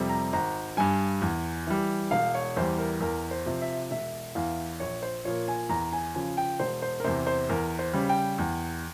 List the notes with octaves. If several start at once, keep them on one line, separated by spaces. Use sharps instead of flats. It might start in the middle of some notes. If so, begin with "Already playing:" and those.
Already playing: F2 C3 G3
A#5
G#1 A#5
G2 G3 G#5
E2
E3 G3
E1 F5
C#5
E2 E3 G3 C5
A#4
E2 A#4
C5
C3 F3
E5
E1 E5
E2 E3 F5
A#1 C#5
C5
A#2 F3 C#5
G#5
E2 A#5
G#5
C#3 F3 G#5
G5
E1 C5
C5
A#4
E2 C3 C5
C5
E2 A#4
C5
C#3 G3
G5
E2